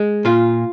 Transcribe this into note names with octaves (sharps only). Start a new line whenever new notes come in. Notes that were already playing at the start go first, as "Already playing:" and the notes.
Already playing: G#3
A#2 F4